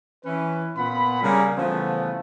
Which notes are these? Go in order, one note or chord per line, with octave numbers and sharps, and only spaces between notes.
E3 C#4 B4
A#2 B3 F4 F#5 B5
C#3 G3 A#3
C#3 E3 F3 G3 A3 B3